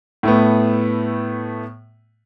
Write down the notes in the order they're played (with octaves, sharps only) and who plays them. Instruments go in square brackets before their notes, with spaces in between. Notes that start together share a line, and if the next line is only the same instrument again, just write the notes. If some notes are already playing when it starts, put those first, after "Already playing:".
[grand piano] A2 A3 B3